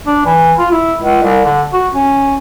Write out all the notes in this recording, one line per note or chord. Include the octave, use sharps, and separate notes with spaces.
D4
E3
F4
E4
C#2
C2
D3
F#4
C#4